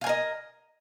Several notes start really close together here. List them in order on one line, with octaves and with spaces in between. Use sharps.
F5 G#5 A#4 D#5